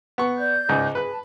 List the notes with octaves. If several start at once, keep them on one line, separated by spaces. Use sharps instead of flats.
B3 C#6
D5 G6
C#2 G#2
G#4 B4 F#6
A5